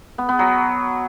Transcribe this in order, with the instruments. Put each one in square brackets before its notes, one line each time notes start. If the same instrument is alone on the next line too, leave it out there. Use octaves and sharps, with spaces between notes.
[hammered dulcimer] B3
B3
F#3